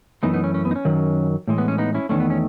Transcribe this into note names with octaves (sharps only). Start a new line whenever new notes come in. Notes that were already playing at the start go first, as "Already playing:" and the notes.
F#2 E3 A3 B3 D#4
B3 D#4
C#4
C#4
B3
D#4
C#4
F#2 D#3 F#3
A2 E3 G#3
B3
C#4
B3 D#4
C#4 E4
E2 D#3 A3 C#4
B3
C#4